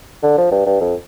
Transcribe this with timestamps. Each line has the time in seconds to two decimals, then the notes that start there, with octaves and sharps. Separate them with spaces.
0.23 D3
0.38 F3
0.52 G2
0.67 G2
0.81 F2